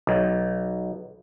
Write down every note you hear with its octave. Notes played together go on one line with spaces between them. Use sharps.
B1